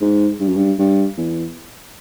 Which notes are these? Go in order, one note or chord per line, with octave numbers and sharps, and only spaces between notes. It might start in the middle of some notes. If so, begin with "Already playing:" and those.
G#2
G2
F#2
G2
G2
E2